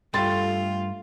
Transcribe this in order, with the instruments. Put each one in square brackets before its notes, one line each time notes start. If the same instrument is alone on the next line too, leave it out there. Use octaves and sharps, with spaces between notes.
[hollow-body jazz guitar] G2 [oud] A3 [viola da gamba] F4 [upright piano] G5 C6 A6